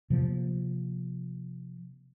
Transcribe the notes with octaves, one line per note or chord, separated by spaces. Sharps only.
C3 F3 A#3